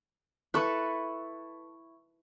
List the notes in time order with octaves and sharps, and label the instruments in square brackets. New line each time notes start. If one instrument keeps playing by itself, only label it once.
[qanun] E4 A4 B4 [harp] C#6 F#6